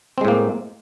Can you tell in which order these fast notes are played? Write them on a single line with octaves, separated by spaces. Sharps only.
C4 G#3 A2 A#3